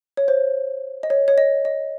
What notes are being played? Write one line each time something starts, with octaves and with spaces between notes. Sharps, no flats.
C#5
C5
D#5
C#5
C#5
D#5
D#5